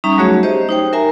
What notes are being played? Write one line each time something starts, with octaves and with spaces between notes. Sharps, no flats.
G3 C#4 D#4 E5 A#5
F#3 A3 F#4 G#4 C#5 E5
G4 C5 D#5
D#4 C5 G5
A#4 E5 G#5 A#5